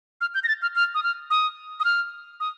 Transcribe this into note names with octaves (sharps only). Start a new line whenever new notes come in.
F6
G6
A#6
A6
F6
F6
D#6
F6
D#6
D#6
F6
D#6